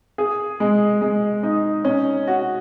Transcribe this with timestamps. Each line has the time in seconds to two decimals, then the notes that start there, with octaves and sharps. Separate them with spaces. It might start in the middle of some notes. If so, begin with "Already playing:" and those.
0.18 G#4
0.60 G#3
1.01 G#3
1.43 D#4
1.85 C#4
2.27 F#4